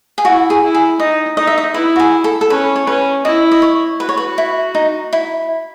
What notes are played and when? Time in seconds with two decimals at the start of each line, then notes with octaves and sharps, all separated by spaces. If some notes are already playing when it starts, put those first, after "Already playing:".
0.18 G#4
0.25 E4 F#4
0.50 G#4
0.63 E4
0.74 G#4
0.99 D#4 D#5
1.37 D#4 D#5
1.47 E5
1.58 D#5
1.74 E4 B4
1.96 F#4
1.99 G#4
2.24 A4
2.41 A4
2.50 C#4 B4
2.76 C#5
2.87 C#4 B4
3.25 E4 D#5
3.51 D#5
3.62 C#5
4.00 F#4 B4
4.09 C#5
4.17 B4
4.38 E4
4.75 D#4
5.13 E4